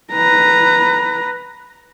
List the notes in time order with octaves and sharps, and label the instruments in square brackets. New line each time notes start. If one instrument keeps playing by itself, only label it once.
[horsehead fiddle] B4 A#5